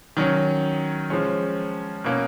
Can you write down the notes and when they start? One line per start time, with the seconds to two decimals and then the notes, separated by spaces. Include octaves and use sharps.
0.17 D#3 F#3 C#4
1.10 F3 G#3 C#4
2.04 B2 A#3 C#4